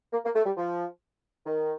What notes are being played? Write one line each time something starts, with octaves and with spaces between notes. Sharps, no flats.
A#3
A#3
A3
G3
F3
D#3